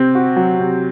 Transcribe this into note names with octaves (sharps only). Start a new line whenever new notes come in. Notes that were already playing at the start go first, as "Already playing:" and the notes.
Already playing: C3 C4
F#4
F#3
C3